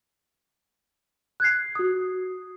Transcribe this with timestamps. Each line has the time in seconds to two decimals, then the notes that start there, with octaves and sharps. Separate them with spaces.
1.40 F#6 G#6 C7
1.75 F#4 D#6